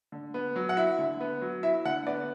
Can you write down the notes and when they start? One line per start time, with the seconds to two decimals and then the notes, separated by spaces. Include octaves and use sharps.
0.12 D3
0.34 B3
0.56 F#3
0.69 F#5
0.77 E4 E5
0.99 D3
1.20 B3
1.41 F#3
1.63 E4 E5
1.85 D3 F#5
2.07 B3 D5